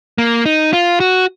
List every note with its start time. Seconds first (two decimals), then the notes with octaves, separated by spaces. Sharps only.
0.18 A#3
0.46 D#4
0.73 F4
1.00 F#4